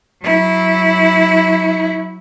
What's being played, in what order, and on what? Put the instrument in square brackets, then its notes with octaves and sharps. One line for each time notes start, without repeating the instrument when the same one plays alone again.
[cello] F#3 E4